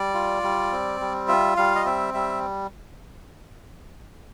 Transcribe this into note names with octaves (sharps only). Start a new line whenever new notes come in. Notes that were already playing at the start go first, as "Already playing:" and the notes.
Already playing: G3 D5
F4
G3
C4
G3
F4 E5
G3 F5
D#5
C4 E5
G3 E5